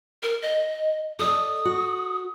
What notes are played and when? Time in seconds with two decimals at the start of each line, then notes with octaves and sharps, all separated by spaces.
0.23 A#4
0.42 D#5
1.19 A4 D5 D#5 D#6
1.65 F#4